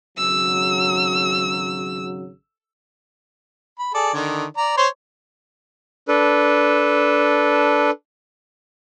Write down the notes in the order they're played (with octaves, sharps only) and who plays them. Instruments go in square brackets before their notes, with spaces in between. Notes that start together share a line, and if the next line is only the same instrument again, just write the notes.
[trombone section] G#1 C#3 F#3 [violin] E6
[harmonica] B5
G#4 A4 D5
D3 D#3
D5 A#5
C5 C#5 C6
[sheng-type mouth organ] D4 A4 B4